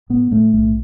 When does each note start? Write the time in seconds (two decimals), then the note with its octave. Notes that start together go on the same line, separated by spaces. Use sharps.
0.10 A2 B3
0.31 A2 A3
0.53 B1 A3